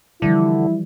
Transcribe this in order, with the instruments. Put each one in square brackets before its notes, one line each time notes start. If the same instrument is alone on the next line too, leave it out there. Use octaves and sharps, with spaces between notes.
[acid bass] D3 [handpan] E3 F3 G3 [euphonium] E4